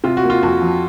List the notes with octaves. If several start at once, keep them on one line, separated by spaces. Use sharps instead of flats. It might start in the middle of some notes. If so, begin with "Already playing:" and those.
C3 F4
F#4
A#3
F4
F2 F#4
F3